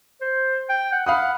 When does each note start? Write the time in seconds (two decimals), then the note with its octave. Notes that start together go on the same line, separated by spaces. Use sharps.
0.21 C5
0.70 G5
0.92 F#5
1.06 F5 F#5 B5 D#6